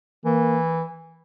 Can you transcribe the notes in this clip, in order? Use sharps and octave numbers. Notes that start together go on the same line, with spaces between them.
E3 A#3